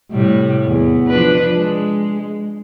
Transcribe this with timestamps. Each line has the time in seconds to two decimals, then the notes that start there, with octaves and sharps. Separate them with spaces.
0.11 A2 C3 G3
0.66 E2
1.07 F3 D4 B4
1.55 G#3